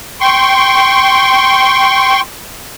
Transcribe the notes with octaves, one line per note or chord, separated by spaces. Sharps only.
G5 C6 C#6